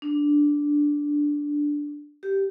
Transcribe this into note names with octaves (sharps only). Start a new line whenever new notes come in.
D4
G4